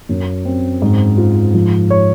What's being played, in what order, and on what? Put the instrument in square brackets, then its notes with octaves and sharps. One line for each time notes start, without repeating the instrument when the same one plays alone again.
[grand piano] F#2
C4
G#2
F4
F3
C#5